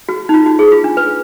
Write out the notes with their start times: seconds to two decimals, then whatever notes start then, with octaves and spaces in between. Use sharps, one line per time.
0.09 F#4
0.29 D#4
0.34 F4
0.46 F#4
0.59 G#4
0.72 F4
0.84 D4
0.97 B4